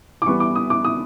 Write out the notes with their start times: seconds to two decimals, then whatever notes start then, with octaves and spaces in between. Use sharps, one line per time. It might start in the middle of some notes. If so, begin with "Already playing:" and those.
0.22 D6
0.26 E3 G3 B3 C#6
0.40 D6
0.55 D#6
0.70 D6
0.85 D#6